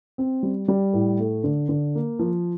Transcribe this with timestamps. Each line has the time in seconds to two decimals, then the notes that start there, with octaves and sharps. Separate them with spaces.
0.18 C4
0.43 G3
0.68 G3
0.93 A2
1.19 A3
1.44 D3
1.69 D3
1.95 A#3
2.19 F3